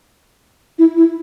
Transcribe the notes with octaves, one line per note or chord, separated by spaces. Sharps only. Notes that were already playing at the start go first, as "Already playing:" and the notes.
E4
E4